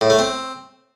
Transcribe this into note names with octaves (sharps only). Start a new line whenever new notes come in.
A2
A3
C4